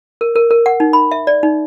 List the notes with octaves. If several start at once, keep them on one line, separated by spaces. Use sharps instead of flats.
A#4
A#4
A#4
F#5
D#4
B5
E5
D5
D#4